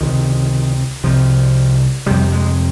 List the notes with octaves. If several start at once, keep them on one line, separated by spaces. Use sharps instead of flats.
C#2 C3 D#3
C2 C3 F3
F2 C3 G3
G#3